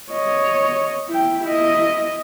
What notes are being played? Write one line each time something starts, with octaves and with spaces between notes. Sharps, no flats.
C#5 D#5
E4 G5
E4 D#5